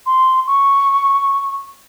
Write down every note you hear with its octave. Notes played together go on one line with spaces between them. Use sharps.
C6
C#6